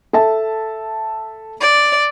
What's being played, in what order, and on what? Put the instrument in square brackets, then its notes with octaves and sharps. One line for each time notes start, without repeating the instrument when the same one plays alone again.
[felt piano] A4 E5 A5
[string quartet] D5